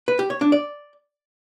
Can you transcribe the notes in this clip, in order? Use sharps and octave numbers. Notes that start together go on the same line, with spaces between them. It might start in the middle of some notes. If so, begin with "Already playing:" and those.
B4
G4
C#5
D4
D5